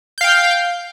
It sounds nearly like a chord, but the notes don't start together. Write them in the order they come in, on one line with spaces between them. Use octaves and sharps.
G6 F5 G5